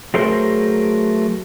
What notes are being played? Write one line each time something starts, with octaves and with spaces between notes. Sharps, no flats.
F#3 A3 G#4 A#4 C5